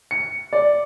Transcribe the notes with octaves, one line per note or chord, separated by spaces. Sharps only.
C#7
D5